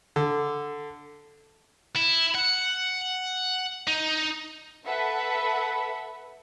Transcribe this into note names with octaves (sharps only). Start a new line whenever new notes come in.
D3
E4
F#5
D#4
A4 B4 E5 F#5 B5